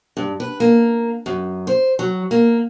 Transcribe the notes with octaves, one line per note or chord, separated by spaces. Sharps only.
G2
B4
A#3
F#2
C5
F#3
A#3